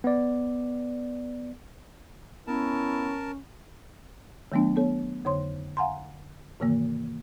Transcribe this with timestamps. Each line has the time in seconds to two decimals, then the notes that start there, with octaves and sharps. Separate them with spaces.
0.04 B3 D5
2.47 B3 C#4 E4 A#4 A5
4.52 D#3 F#3 A3 B3 D4
4.76 B3 A4 C#5
5.25 F2 D3 C#5 C6
5.77 F5 F#5 G#5 A#5 C6
6.60 G#2 C3 D#3 E3 A#3